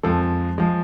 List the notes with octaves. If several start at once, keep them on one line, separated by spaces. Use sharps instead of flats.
F2 F3 G#3 A4
F3 G#3